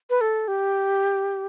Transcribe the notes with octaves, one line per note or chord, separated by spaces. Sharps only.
B4
A4
G4